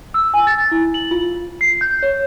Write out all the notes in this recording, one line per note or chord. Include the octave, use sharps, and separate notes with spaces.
E6
G#5
A6
E4
F#7
F4
C7
G6
C#5